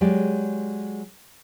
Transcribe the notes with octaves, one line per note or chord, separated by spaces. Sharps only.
F#3 G#3 G4 D5